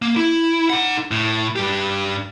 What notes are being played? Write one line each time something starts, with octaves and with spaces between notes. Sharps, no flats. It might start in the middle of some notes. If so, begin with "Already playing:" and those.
A#3
E4
D#4 F#5
A2
G2 G4